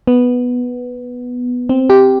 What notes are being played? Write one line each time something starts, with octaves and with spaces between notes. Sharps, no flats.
B3
C4
G4